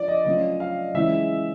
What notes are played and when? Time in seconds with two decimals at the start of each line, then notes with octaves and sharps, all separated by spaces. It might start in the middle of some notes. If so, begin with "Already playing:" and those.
Already playing: F3 D4 F4 D5
0.08 D#5
0.25 C#3 F#3 A3 C#4 F4 D#5
0.60 F5
0.94 C#3 E3 G#3 C#4 E4 E5